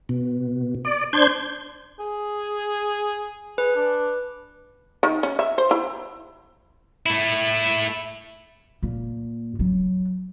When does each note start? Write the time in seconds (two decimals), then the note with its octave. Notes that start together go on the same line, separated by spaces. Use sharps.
0.09 B2
0.85 D5
1.13 D4 C5 G6 G#6
2.00 G#4
3.58 G#4 B4
3.76 D4
5.03 D#3
5.23 C#4
5.39 E5
5.58 C5
5.71 E4
7.06 A3 E4
8.83 A#2
9.59 F#3